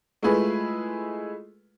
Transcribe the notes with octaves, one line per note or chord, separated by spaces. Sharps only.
G#3 A3 E4 F4 G#4 B4